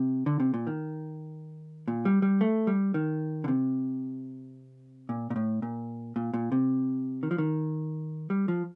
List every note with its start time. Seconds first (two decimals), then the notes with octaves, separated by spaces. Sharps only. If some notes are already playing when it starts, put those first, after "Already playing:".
Already playing: C3
0.26 D3
0.40 C3
0.54 A#2
0.67 D#3
1.88 A#2
2.05 G3
2.22 G3
2.41 A3
2.67 G3
2.94 D#3
3.44 D3
3.48 C3
5.09 A#2
5.30 A#2
5.36 A2
5.62 A#2
6.16 A#2
6.34 A#2
6.52 C3
7.23 D#3
7.31 F3
7.38 D#3
8.30 G3
8.48 F3